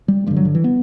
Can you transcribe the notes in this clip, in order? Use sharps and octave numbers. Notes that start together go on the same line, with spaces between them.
G3
G2 D3 G3
F#3
D3
E3
B3